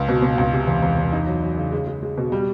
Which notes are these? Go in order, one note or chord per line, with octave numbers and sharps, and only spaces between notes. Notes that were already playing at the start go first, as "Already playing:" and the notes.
Already playing: C#2
B2
B2
C#2
C3
E2
E2
E2
D#4
F#3
F#3
C#3
G#3
G#3
G#3
B2
G3